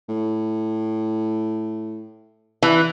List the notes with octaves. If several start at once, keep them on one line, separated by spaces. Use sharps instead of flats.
A2
E3